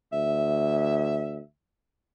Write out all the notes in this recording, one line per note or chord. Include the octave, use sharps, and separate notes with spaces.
D2 E5